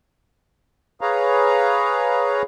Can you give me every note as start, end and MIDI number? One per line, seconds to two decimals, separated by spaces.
1.01 2.42 68
1.01 2.42 71
1.01 2.42 73
1.01 2.42 77
1.01 2.42 82